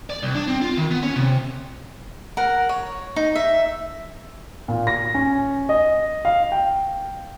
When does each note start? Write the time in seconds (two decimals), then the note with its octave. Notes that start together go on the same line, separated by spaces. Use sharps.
0.10 D5
0.23 C2
0.36 D4
0.48 C4
0.61 F4
0.77 D#3
0.91 B3
1.03 C#4
1.16 C3
2.37 A#4 F#5
2.69 C#5
3.16 D#4
3.35 E5
4.68 A#2
4.87 A#6
5.14 C#4
5.69 D#5
6.25 F5
6.52 G5